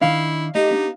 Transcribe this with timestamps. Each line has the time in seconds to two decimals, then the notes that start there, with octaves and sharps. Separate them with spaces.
0.01 D#3 D4 E4 F5
0.55 A3 D#4 G4 D#5
0.71 B3 D4